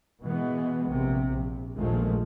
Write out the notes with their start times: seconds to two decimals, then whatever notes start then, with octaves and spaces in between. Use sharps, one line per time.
0.24 B2 E3 G#3 B3
0.88 A#1 C3
1.31 A#1
1.76 A#1 D#2 A#2 F3 G#3 A3